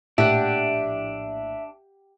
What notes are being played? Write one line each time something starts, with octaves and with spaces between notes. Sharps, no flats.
A#1 A2 D4 G4 E5 F#5